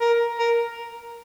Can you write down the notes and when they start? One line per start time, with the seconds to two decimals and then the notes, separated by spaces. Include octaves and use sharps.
0.01 A#4
0.39 A#4